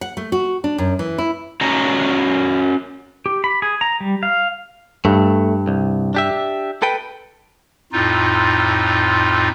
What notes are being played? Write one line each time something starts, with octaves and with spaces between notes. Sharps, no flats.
F#5
A3
F#4
D4
F#2
E3
E4
C#4 F#4 C#5 D#5 A5 A#5
G4
B5
G#4
A#5
G3
F5
G2 A3
C2
D4 G4 E5
A4 B4 G5
F2 A2 D#4 F4